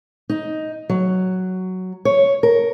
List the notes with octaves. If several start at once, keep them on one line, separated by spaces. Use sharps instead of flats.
D#4
F#3
C#5
A#4